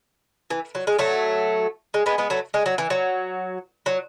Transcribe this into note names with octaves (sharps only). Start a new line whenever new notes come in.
E3
F#3
G#3
F#3 A3
G#3
G#3 B3
G#3 B3
F#3 A3
G#3
F#3
E3
F#3
F#3